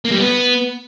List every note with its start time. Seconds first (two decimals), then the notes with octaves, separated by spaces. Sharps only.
0.05 A#3
0.12 G3
0.19 B3